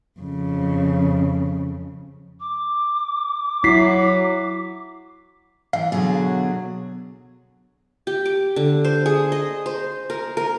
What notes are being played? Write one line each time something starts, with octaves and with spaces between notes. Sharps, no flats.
F2 C#3
D6
F#3 E4 B6 C7
E3 F5
B2 D3 F#3 G#4
G4
D6
D3
C5
G#4
D#5
C5
A#4
A#4